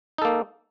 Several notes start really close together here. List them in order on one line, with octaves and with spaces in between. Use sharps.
D#4 A4 A#3